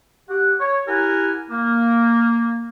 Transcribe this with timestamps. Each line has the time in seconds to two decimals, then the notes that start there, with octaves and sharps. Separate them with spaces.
0.28 G4 F#5
0.59 C#5
0.86 E4 G4 A#4 F#5 G#5
1.49 A#3